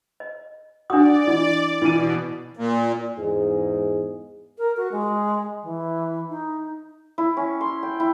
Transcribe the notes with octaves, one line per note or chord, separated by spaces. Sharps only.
D#5
D4 F#4 D5 F#5 D#6
E3 D#5
B2 E3 D#7
A#2
E2 G#2 G#3
A#4
F#4
G#3
E3
D#4
E4
C#4
C6
G5
E4